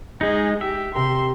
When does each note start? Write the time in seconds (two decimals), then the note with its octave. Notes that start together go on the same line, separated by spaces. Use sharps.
0.21 G#3 D#4 G#4
0.61 G4 E5
0.95 C3 G4 A#4 C6